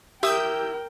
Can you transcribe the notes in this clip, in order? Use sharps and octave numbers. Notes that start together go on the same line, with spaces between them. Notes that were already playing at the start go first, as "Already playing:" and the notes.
E4 G4 A#4 G5 D#6 E6 G6